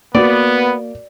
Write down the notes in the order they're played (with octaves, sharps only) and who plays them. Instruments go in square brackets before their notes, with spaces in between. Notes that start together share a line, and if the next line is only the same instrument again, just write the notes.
[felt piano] A#3 F#4 [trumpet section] B3 [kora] D5